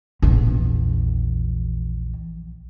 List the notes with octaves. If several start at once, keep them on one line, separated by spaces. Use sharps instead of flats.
A#1 E2